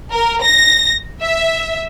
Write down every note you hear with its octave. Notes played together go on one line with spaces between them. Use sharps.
A#4
A#6
E5